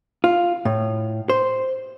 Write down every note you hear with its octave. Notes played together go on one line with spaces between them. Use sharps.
F4
A2
C5